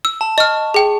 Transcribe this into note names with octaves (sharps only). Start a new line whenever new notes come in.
E6
A5
D#5 C#6 F6
G#4 G5